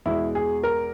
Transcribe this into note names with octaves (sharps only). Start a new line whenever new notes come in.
E2 B2 G#3 E4
G#4
A#4